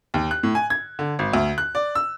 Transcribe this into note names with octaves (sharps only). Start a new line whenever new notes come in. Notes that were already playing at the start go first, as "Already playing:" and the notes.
D#2
F#6
A2
G#5
G#6
D3
G#1
D2
F#6
D5
E6